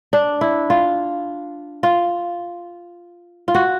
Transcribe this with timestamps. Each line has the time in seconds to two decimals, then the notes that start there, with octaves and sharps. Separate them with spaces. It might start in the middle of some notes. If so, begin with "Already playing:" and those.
0.13 D4
0.41 E4
0.70 F4
1.83 F4
3.48 F4
3.54 F#4